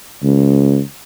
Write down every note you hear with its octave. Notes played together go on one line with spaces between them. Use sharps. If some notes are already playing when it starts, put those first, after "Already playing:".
C#2